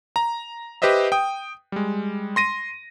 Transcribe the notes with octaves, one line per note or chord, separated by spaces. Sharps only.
A#5
G4 B4 C5 D#5 E5
G5 D#6
G3 G#3
C6 A#6 D#7